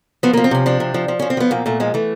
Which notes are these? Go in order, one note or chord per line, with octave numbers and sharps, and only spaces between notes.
F3 B3
F3 A#3
C4
C3 C#4
F3 D4
C3
F3
F3
F3 C#4
C4
F3 B3
A#2 A#3
A#2 A3
F3 G#3
E3 A3